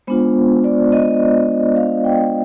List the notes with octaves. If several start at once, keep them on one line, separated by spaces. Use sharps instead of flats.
G#3 B3 D4 F4 C5
D5
D#5
F5
G5